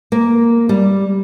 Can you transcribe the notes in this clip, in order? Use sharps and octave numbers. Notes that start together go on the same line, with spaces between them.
A#3
G3